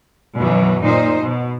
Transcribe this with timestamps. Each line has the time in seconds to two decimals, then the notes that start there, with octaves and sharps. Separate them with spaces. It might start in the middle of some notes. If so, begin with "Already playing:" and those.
0.38 F#2 B2 D#3 E3 F#3
0.84 A#2 D#4 C5
1.22 B2